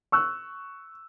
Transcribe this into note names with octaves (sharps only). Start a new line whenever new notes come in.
C#6 E6 F#6